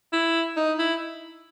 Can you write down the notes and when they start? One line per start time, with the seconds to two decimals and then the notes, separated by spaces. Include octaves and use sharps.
0.13 E4
0.57 D#4
0.79 E4